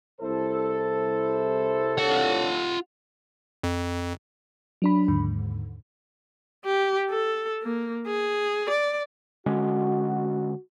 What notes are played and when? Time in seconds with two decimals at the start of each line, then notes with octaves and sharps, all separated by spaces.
0.20 C2 E4 A4 C5
1.99 C4 D4 F4 C#5 F#5
3.64 F2
4.82 F#3 D4 B5
5.08 D#2 G#2 D3
6.65 G4
7.10 A4
7.62 A#3
8.07 G#4
8.70 D5
9.46 D3 G#3 C#4 F#4